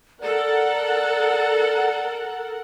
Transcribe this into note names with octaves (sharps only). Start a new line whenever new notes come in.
A4 A#4 D5 F#5